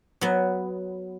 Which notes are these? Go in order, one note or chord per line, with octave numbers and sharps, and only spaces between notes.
F#3 B3